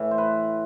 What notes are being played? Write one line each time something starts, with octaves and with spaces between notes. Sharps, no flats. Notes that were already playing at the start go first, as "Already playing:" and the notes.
Already playing: A2 E3
C5
B4